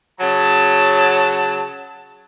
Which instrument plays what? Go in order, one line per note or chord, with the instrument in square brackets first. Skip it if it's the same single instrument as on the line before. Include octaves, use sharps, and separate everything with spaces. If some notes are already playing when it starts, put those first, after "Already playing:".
[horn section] C#3 F#3 A5